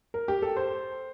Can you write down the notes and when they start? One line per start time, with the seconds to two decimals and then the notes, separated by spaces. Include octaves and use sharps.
0.14 A#4
0.28 G4
0.42 A4
0.57 C5